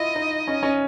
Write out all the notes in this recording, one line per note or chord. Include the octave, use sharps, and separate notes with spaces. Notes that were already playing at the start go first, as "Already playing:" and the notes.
Already playing: E4 F4 D#5
D#4
C#4
C#4